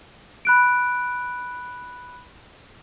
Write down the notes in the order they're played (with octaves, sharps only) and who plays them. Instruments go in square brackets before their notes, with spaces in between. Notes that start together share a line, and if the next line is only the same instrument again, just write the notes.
[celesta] B5 F#6 D7